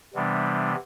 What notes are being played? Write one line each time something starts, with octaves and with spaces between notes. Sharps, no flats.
C3 E3 G3 B3 D4